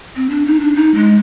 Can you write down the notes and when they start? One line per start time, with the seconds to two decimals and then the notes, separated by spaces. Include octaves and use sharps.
0.16 C4
0.30 D4
0.46 D#4
0.60 D4
0.76 D#4
0.94 G#3